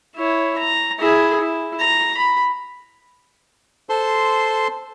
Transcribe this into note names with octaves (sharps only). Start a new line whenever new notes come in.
E4 C#5
A#5
E4 G#4
E4
A#5
B5
A4 C5 C6